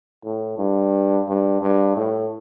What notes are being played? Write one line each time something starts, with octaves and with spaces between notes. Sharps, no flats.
A2
G2
G2
G2
A2